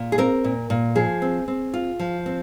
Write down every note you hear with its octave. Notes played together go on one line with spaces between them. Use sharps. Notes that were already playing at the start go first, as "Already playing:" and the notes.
Already playing: A#2
G#4
C4 A#4
A#2
A#2
F3 G#4
C4
C4
F4
F3
C4